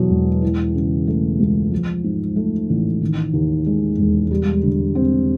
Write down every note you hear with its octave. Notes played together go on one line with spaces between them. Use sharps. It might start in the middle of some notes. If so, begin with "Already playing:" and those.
Already playing: E2 B2 F#3
E1
E3
C#3
A3
C#2
F3
G#2
A3
A1
D#3
D#2
G#3
E1
G3
D3
C4